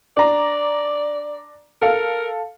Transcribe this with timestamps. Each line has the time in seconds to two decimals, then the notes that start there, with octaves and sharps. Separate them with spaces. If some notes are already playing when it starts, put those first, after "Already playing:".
0.17 D4 D5 A#5
1.82 A4 A#4 F5